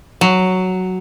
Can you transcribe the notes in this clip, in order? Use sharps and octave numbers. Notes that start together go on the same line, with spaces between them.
F#3